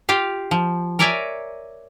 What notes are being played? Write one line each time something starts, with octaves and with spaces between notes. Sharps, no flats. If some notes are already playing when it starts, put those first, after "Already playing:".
F4 G4 F5
F3
A#4 C#5 D5 E5 G#5 A#5